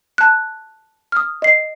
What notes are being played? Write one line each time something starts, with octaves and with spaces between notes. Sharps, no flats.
A5 F#6
D#6 F6
D#5 C7